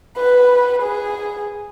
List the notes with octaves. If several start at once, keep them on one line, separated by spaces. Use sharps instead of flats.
B4
G#4